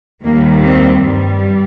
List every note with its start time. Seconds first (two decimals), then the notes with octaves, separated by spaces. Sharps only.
0.23 D#2 D#3 G3 A#3
0.63 C4
1.03 G2 G3